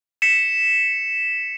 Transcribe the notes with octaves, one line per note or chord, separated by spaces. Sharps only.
B6 C#7 E7